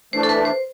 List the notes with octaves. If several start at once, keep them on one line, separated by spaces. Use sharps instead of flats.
E3 A3 D4 C5
A4
B4
C5